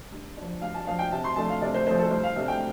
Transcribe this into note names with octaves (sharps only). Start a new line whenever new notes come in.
G2
F3 D4
G2 F5
A5
F3 D4 F5
G5
C3 A5
C6
F3 A3 D4 A5
F5
C3 D5
C5
F3 A3 D4 C5
A4
C2 C5
F5
C3 A3 D4
G5